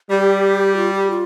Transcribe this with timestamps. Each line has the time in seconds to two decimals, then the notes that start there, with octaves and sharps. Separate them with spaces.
0.10 G3 G4
0.77 F4
0.94 G4
1.10 F4